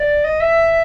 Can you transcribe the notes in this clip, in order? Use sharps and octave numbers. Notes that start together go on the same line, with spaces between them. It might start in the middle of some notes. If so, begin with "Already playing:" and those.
Already playing: D5
D#5
E5